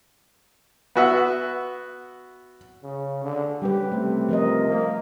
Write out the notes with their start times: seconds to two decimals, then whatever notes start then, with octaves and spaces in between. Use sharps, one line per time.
0.96 B3 F#4 E5
2.83 C#3
3.23 D3
3.62 G3 C#4 G4 B4
3.92 C3 A3
4.29 F3 A#4 D#5
4.68 A#3